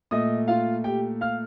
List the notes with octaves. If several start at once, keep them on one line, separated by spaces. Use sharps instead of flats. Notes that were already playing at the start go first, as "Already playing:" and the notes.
A#2 A3 D#5 D#6
F4 F5
G4 G5
F5 F6